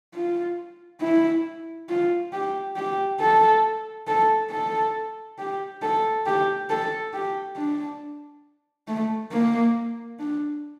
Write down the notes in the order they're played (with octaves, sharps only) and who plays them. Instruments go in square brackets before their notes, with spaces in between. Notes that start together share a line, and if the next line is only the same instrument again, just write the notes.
[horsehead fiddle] F4
E4
F4
G4
G4
A4
A4
A4
G4
A4
G4
A4
G4
D4
A3
A#3
D4